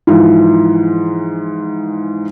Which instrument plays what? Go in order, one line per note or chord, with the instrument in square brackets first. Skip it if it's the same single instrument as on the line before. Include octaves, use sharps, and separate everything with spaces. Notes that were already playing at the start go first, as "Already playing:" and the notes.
[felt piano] G#2 E3 F3